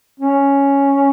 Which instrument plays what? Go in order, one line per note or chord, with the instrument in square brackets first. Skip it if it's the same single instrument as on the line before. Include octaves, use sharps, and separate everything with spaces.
[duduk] C#4